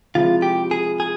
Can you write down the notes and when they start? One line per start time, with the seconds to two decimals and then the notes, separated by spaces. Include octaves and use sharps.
0.15 C3 F3 G#3 E4 F4
0.42 G4
0.71 G#4
1.00 G#4